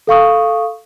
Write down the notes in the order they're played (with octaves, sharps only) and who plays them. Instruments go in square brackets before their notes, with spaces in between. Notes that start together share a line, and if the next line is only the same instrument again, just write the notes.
[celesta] A4 F5 C#6 D#6